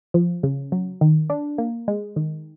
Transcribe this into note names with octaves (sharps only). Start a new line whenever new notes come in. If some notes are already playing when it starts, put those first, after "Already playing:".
F3
C#3
F#3
D#3
D4
A#3
G#3
D#3